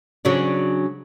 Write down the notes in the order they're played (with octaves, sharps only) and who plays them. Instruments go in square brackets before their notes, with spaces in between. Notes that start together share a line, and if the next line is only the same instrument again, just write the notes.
[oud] C#3 F#3 D4